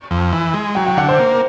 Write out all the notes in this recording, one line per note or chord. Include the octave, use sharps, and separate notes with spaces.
F2
E3
G#3
F#3 G5
G5
D3 F#5
C5
A#3